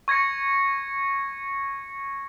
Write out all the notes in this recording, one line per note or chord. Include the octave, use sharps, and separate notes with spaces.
C#6 G#6 A#6 C#7